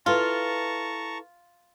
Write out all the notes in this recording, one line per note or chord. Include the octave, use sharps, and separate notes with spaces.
E4 F4 A4 B4 A5 A#5 C#6